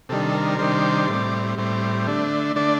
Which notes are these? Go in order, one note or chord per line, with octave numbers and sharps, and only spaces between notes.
C3 D#3 G3 D4 A4
A#4
C3 D#3 G3 D4 C5
A2 G3 C4 D5
A2 G3 C4
D3 A3 D4
D3 A3 D4 D5